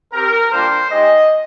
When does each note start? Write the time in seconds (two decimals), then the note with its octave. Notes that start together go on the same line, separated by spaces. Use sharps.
0.13 C4 G4 A#4
0.52 G3 A#3 D4 F4 C5
0.90 G#3 D#4 G4 D#5